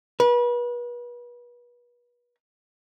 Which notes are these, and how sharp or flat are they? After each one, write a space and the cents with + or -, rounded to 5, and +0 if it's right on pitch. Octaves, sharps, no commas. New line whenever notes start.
B4 -35